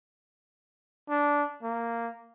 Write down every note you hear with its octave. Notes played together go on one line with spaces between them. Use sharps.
D4
A#3